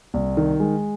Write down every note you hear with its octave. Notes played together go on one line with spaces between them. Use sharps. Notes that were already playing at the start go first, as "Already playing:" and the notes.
C2
D#3
G#3